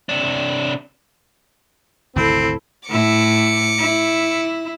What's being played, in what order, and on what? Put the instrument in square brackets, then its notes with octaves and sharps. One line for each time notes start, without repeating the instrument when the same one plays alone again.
[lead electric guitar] C3 D4
[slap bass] G#1 D2 C3 [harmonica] C4 [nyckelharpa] E4 A4
[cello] A2 E4 [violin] D6 C#7
[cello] E4